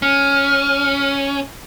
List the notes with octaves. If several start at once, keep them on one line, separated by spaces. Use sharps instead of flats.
C#4 F6